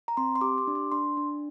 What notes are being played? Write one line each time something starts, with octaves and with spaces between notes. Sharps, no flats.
A#5
C4 C6
C6
G4 D6
D6
D4
C6
D4 C6
D4